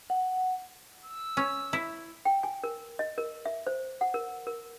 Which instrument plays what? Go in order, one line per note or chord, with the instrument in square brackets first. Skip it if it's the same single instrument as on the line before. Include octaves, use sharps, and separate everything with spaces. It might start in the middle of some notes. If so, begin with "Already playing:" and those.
[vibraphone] F#5
[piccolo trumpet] E6
[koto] C#4
E4
[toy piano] G5
G#5
A#4
D#5
A#4
E5
C5
F#5
A#4
A#4